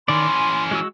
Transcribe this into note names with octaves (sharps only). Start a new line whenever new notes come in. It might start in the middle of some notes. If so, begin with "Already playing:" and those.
D#3 E3 C#4 D5 C6
G#5
G#3 F#4 E6